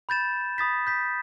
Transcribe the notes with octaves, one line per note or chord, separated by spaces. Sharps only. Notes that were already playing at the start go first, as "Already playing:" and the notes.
B5 G6 A6 E7
B5 D#6 A6 B6
G6 B6